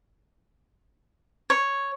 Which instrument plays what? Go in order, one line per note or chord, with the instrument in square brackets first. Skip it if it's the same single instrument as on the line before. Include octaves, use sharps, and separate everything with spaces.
[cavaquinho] C#5